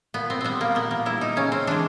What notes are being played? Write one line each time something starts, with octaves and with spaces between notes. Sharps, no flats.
A#2 B3
C4
G3 B3 C4
A#3
A#2 B3
A#3
G3 E4
D#4
C#3 C#4
C4
E3 G#3 D4